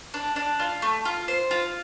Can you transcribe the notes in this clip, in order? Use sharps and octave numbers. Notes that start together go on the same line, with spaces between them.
D4
D4
F4
A3
F4
C5
F4